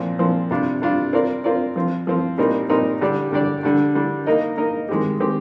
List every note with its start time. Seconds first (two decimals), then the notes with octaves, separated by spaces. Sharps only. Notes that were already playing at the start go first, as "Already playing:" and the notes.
Already playing: A#2 F3 C4
0.19 A#2 F3 C4
0.50 C3 G3 D4 F4
0.82 C3 G3 D4 F4
1.13 C4 F4 A#4 D5
1.44 C4 F4 A#4 D5
1.76 F3 C4 F4
2.07 F3 C4 F4
2.38 A#2 G3 C4 D#4 A#4
2.70 A#2 G3 C4 D#4 A#4
3.01 D3 G3 D4 G4 D5
3.32 D3 G3 D4 G4 D5
3.63 D3 G3 D4
3.95 D3 G3 D4
4.26 A#3 D#4 A#4 D#5
4.57 A#3 D#4 A#4 D#5
4.89 D#3 G#3 C4 G4
5.20 D#3 G#3 C4 G4